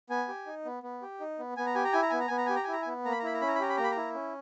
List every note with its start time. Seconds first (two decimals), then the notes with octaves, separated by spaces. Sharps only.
0.10 B3 G#5
0.28 G4
0.46 D#4
0.65 B3
0.83 B3
1.02 G4
1.20 D#4
1.39 B3
1.57 B3 G#5
1.66 A#5
1.75 G4 G#5
1.84 A#5
1.93 E4 G#5
2.02 A#5
2.10 B3 G#5
2.20 A#5
2.28 B3 G#5
2.38 A#5
2.46 G4 G#5
2.56 A#5
2.64 G#5
2.68 E4 A#5
2.82 G#5
2.87 B3
3.05 A#3 A#5
3.12 B5
3.20 A#5
3.23 E4 B5
3.34 A#5
3.41 C#4 B5
3.48 A#5
3.55 B5
3.60 G4 A#5
3.69 B5
3.77 A#3 A#5
3.84 B5
3.91 A#5
3.96 E4
4.15 C#4